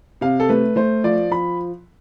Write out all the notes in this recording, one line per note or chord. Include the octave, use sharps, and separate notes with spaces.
C3 F5
A4
A3 B4
A3 C5
F3 D5
F3 B5